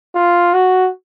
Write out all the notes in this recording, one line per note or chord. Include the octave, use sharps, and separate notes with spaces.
F4
F#4